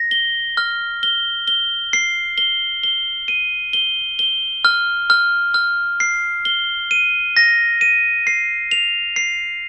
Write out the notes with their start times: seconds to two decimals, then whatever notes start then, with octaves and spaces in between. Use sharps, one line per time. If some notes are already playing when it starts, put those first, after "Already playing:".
Already playing: A#6
0.11 G7
0.57 F6
1.03 G7
1.48 G7
1.93 C7
2.38 G7
2.83 G7
3.28 D#7
3.73 G7
4.19 G7
4.65 F6
5.10 F6
5.54 F6
6.00 C7
6.45 G7
6.91 D#7
7.37 A#6
7.81 D#7
8.27 C7
8.71 F7
9.16 C7